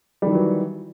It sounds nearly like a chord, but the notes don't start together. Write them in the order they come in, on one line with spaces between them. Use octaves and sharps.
G3 D#3 F#3 E3